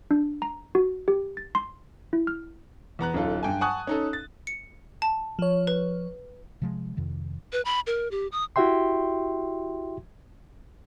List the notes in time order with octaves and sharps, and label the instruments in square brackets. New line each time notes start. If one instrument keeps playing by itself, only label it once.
[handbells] D4
A#5
F#4
G4
A6
C6
E4
F6
[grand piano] E2 B3 A#5 F#6
D1 C#4 D#4 F4 A4
G2 G5 G#5
F#5 G#5 A5 C#6 D#6 F#6
C#4 D#4 A4
A6
[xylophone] C#7
A5
[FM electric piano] F3 C#5
[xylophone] B4
[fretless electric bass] C3 F3 G#3
F2 C3 D#3
[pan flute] B4
B5
A#4
G4
D#6
[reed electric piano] E4 F#4 G4 E5 G5 C6